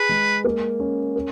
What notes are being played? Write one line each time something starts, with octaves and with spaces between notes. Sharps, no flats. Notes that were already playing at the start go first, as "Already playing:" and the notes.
Already playing: G#4 B4
G#3
A#3
C#4
A#4